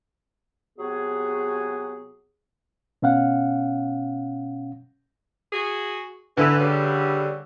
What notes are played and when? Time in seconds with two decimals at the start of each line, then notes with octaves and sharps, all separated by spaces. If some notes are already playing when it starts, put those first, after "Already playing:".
0.79 C3 F#3 B3 F#4 G#4
3.02 B2 C#4 F5 F#5
5.53 F#4 G#4
6.37 D3 E3 B4 E6
6.58 G2 C#3 G3